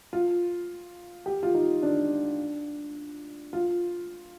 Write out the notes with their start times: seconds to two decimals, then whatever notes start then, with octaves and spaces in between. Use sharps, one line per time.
0.13 F4
1.26 G4
1.43 F4
1.54 D#4
1.83 D4
3.53 F4